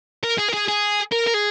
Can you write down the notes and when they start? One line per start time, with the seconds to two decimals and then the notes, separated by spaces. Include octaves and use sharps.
0.24 A#4
0.39 G#4
0.49 A#4
0.54 G#4
0.68 G#4
1.12 A#4
1.27 A#4
1.34 G#4